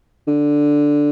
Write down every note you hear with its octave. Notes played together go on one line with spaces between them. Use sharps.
D3